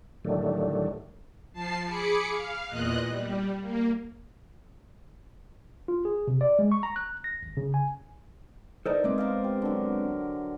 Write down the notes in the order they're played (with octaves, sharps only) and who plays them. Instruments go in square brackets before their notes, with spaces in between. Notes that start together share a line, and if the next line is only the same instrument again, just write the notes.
[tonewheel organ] A2 D3 D#3 F#3 G3 A3
[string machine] F3 A5 C7
G#4 B5 D6 C#7
F5
E2 A#2 D#5 F#6
G3
A#3
[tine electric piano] F4
G#4
C3
D5
G#3
C#6
A#5
F#6
A#6
G#1
C#3
G#5
[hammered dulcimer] D#4 A#4 [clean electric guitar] A4 C5 D5
[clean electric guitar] G#3 B3 C4 [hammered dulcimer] D5 E5
[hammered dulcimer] A#4 C5 F5
G4
D3 F#3